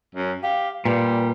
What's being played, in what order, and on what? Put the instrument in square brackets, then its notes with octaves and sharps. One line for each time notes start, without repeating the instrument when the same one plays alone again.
[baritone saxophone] F#2
[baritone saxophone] G4 [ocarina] F5
[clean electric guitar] A#2 [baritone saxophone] G3 [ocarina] B4